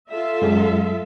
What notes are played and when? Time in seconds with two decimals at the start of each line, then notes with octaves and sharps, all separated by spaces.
0.10 F4 A4 E5
0.42 F#2 F#3 G#3